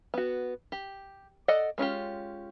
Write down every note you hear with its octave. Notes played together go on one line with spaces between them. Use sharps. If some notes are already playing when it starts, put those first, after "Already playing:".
B3 F#4
G4
A4 D5 D#5 F#5
G#3 C#4 F4 G4